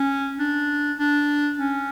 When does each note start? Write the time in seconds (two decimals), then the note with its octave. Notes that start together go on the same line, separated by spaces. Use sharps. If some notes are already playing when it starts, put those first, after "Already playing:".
Already playing: C#4
0.39 D4
0.99 D4
1.59 C#4